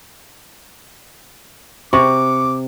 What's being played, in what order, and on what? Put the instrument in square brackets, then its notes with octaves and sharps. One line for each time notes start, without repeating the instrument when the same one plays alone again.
[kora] C3 [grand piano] C#6 [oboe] D6